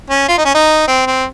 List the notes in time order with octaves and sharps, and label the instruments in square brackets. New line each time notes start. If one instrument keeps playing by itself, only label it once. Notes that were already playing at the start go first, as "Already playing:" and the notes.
[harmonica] C#4
F4
D#4
C#4
D#4
C4
C4